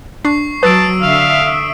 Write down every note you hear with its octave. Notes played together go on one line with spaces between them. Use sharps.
D4 C#6 C7
F#3 B4 A5 D#6 E6 D7
D3 E5 F5